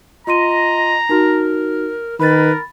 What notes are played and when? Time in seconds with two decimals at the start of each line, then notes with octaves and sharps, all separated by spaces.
0.27 F4 D#5 A#5 C6 D#7
1.09 D#4 F#4 A#4
2.20 D#3 A#4 B4 B5 A6